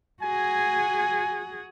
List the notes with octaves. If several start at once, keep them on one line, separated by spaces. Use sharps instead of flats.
F#4 G#4 G#5